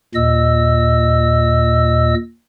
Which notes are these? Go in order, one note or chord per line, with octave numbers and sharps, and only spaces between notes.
D#2 A#2 D#5 E6